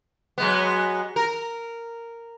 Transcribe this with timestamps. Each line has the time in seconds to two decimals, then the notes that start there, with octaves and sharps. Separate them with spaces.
0.38 F#3 G#3 B3
1.16 A#4